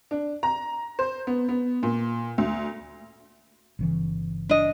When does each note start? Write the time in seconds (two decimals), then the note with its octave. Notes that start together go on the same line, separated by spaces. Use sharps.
0.11 D4
0.43 A#5
0.99 C5
1.27 B3
1.49 B3
1.83 A#2
2.38 D2
3.79 G1 C#3 E3
4.49 D4 D#5